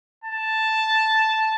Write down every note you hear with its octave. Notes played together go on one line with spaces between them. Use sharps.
A5